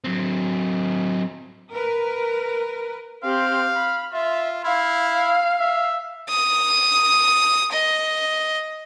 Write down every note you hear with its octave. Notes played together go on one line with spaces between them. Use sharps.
F#3 C4
A#4 B4
C4 G4 F5
B5
F4 E5
E4 F5
E5
D#6
D#5